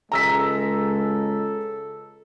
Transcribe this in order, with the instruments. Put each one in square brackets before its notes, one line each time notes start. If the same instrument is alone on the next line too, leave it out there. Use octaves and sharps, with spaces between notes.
[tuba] C#2 [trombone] G#3 [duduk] A4 [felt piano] A#5 E6 B6